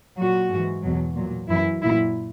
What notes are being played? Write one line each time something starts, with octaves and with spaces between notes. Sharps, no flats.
A#2 F#3 F#4
G#2 E3
E2 B2 F#3
A#2 F#3
F#2 E3 E4
A#2 F#3 E4